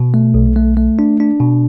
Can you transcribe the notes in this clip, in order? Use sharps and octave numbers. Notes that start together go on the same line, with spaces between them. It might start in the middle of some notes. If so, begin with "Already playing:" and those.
Already playing: B2
A3
B1
A3
A3
D4
D4
B2